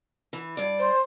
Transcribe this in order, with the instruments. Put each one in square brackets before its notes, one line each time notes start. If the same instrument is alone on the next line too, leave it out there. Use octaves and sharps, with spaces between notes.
[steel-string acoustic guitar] E3
G2 D5
[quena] C5